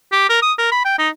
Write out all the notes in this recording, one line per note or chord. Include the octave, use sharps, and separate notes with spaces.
G4
A#4
D#6
A#4
B5
G5
D#4